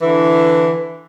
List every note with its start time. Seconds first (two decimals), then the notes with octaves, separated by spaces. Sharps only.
0.01 D3 E3